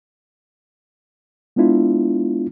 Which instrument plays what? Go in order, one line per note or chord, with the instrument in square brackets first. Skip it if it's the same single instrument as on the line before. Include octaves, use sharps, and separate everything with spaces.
[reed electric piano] G#3 B3 D4 E4 F4